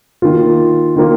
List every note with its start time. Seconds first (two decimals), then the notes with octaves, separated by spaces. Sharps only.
0.22 D#3 A#3 F4
0.96 D#3 A#3 F4